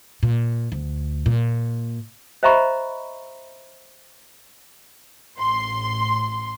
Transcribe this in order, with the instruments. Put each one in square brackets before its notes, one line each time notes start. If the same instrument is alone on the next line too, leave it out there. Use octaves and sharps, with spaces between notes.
[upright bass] A#2
D2
A#2
[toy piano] C5 D#5 E5 A#5 B5 C#6
[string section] A1 C6